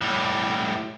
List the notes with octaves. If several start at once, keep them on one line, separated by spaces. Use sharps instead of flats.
A2 G3